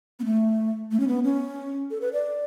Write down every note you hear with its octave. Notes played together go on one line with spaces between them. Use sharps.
B3
A3
A3
C#4
B3
C#4
A4
B4
D5